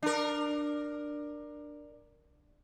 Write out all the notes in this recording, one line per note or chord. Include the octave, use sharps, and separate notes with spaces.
D4 A#4